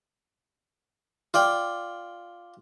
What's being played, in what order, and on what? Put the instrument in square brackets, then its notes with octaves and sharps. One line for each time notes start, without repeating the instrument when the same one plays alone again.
[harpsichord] F4 D5 G5